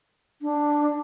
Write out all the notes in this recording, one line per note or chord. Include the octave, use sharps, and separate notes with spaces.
D4